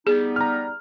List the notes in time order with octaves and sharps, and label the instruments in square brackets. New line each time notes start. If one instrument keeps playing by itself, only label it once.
[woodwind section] G3 B3 D#4 [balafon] G#4
[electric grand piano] A#5 F6